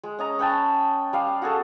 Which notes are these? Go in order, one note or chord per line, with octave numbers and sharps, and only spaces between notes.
G#3
C#4 D#5 A#5
C#4 B4 G5 A5
G3 F5
F#4 G#4 A4